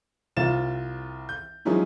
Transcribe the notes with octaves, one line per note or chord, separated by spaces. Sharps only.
C2 C4 F4 A6 E7
G6
F3 F#3 G#3 C#4 D#4 E4